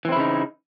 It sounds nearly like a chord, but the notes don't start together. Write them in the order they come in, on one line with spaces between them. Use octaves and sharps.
E3 C4 E4 C#3 D#4